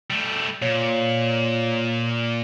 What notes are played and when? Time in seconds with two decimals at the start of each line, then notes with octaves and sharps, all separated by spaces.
0.10 G3 A3
0.62 A#2 C#5